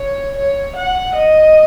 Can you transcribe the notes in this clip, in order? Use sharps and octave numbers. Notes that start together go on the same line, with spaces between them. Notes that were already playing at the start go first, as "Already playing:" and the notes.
Already playing: C#5
C#5
F#5
D#5